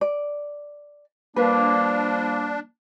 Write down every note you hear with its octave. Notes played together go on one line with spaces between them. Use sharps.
D5
F3 G3 A#3 D4 A#4 B4